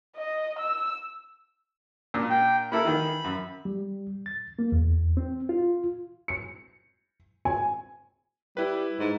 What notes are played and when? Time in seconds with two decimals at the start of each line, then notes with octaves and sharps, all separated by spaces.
0.16 D#5
0.59 E6
2.14 A#2 D4
2.30 G5
2.72 A#3 E4 A4 B5
2.85 D#3 E3
3.24 F#2
3.65 G3
4.26 A6
4.59 A#3
4.72 E2
5.17 C4
5.49 F4
6.28 C#7
7.45 G#5
8.57 G3 E4 B4
9.00 G#2